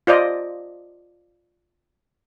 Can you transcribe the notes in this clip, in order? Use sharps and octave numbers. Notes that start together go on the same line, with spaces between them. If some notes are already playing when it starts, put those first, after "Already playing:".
F4 C5 D5 D#5